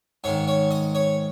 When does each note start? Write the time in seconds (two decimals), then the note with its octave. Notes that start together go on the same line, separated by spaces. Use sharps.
0.24 G#2 D#3 C#5
0.48 C#5
0.71 D#5
0.95 C#5